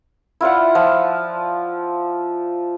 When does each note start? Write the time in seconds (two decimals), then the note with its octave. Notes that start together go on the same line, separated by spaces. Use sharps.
0.41 E4 F4 D5 F#5
0.75 F3